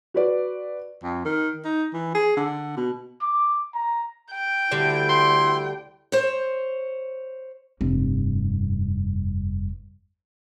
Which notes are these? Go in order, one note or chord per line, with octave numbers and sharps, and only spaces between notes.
F#4 B4 D5
F2
D#3
D#4
E3
G#4
D3
B2
D6
A#5
G5
D2 D3 G3 E4
C6
C5 C#5
F1 G2